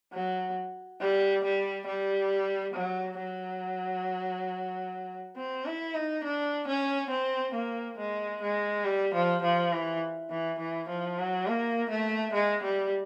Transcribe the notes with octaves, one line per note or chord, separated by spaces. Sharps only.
F#3
G3
G3
G3
F#3
F#3
C4
E4
D#4
D4
C#4
C4
A#3
G#3
G#3
G3
F3
F3
E3
E3
E3
F3
F#3
A#3
A3
G#3
G3